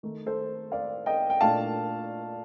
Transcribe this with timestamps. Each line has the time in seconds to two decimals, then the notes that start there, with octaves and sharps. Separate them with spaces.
0.03 D#3 A3 D#4
0.26 A4 C5
0.72 D5 F5
1.06 D#5 G5
1.30 G5
1.41 A#2 A3 D4 F5 A5